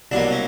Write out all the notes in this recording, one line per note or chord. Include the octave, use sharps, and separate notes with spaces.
C2 B2 F#3 A#3 D4
C#4